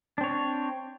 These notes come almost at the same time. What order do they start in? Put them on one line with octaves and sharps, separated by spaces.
D4 C4 C#5